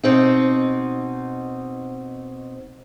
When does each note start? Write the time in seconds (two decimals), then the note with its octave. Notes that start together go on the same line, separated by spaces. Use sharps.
0.03 B2 C4 D#4